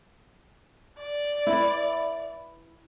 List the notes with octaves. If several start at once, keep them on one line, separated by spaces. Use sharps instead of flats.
D5
E4 B4